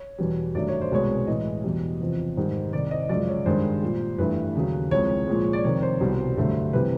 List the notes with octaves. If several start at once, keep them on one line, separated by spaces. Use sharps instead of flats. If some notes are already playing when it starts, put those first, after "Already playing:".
Already playing: C#5
E2 B2 G3
G2 D#3 F#3 A3 D5
C#5
C5
C2 B2 G#3 C#5
A2 E3 G#3 D#5
E2 B2 G3
E2 C3 F3
G#2 D#3 G3
C2 C3 D#3 D5
D#5
F#2 C#3 F3 G#3 D5
C#5
G2 D#3 G#3 C5
A#2 G3
G2 E3 A3 B4
D#2 C#3 F#3
C2 C3 F3 G#3 C#5
A#2 F3 G#3
D5
F2 C3 D#3 C#5
C5
C2 B2 G3
G2 D3 F#3 A3
C3 E3 G3 B4